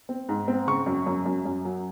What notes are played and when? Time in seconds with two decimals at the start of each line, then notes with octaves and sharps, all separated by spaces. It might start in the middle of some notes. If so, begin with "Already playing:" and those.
0.09 C4
0.29 G#2
0.48 C4
0.67 C#3 C#6
0.86 F#2
1.06 F#2
1.26 F#2
1.45 F#2
1.65 F#3